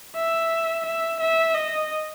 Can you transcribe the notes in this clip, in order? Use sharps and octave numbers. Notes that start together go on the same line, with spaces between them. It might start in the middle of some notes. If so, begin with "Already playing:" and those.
E5
E5
E5
D#5